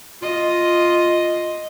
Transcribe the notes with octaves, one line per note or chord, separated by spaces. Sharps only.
F4 D#5